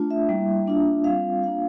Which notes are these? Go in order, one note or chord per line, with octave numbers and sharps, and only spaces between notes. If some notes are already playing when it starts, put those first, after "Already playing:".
Already playing: A3 D4 F4
E5
G3 A#3 E4
A#3 D4 F4
G3 C4 F4 F5
A#3 D4 F4 F5